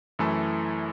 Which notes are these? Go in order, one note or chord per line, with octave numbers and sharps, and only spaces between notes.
F#2 E3 A3 E4 A4